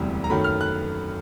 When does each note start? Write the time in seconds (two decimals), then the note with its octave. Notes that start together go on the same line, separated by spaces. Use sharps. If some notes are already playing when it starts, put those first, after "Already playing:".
Already playing: E1 D2 C3 E3 G3
0.24 A#5
0.30 F#2 D#3 F#3 A3 B5
0.44 F6
0.61 F#6